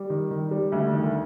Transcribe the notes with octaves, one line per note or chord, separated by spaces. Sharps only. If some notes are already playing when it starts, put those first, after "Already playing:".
Already playing: G3
D#3
D#3
G3
D2
D#3